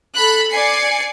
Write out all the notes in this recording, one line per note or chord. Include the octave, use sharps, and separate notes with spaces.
A4 B5 F#6
D5 G#5 C7 C#7